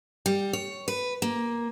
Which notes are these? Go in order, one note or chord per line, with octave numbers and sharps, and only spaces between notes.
G3
C#5
B4
A#3